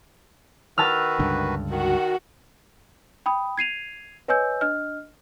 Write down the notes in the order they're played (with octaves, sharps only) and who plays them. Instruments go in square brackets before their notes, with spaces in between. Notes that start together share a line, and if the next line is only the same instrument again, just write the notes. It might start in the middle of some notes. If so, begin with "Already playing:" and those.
[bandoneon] D#3 F#4 B4 [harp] A5 E6 F6
[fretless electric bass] C#2 G2 D3
[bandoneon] D#3 [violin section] F#4
[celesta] G5 B5 D#6
G#6 C7 D#7 F7
B4 C#5 D#5 G#5 E6 G6
D4 D#5 F6